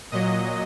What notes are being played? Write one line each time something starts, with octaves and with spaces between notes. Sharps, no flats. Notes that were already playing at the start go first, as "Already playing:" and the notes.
A#2 F#3 D#5